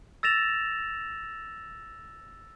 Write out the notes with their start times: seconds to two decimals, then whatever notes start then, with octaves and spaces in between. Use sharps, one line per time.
0.23 E6 A6 A#6 E7 F7